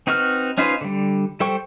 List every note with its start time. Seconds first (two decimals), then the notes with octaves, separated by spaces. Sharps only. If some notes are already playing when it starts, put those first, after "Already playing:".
0.07 C4 D#4 F#4 B4 F6
0.58 C#4 D#4 F4 B4 C5
0.81 D3 G3
1.40 G3 A4 C5 G5 C#6